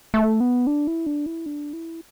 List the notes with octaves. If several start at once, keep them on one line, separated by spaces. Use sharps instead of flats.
A3
B3
D4
E4
D4
E4
D4
E4